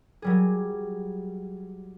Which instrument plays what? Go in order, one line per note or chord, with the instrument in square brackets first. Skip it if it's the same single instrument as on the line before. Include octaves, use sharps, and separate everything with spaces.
[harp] F#3 G3 G#4